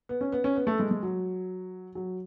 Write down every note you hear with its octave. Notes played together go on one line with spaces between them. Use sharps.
B3
C#4
B3
C#4
B3
A3
G#3
G#3
F#3
F#3